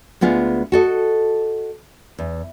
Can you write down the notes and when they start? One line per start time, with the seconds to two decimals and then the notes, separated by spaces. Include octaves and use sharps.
0.21 D2 G#3 B3 F4
0.72 F#4 A4 D#5
2.19 E2